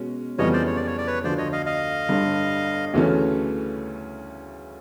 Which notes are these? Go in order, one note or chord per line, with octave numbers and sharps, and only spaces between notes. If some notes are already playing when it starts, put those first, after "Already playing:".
Already playing: B2 G#3 C#4
F2 C#3 E3 G3 B3 C#5 D#5
C5 D5
C#5
D5
C#5
D5
B4 C#5
D2 D3 F3 C5 D5
C#5 D#5
D#5 F5
D#5 F5
G1 G2 D3
D2 C#3 E3 A3 C#4